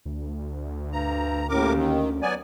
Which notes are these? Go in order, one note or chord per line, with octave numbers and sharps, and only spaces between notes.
D2
G2 A#5
D#2 A2 C#4 A#4 D6
D#3
F#3 B3 D5 G#5